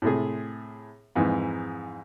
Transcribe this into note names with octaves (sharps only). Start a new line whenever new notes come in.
A2 C3 A3 G#4
F2 G#2 E3